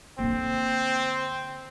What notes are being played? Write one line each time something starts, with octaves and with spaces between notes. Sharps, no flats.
D3 A#3 C4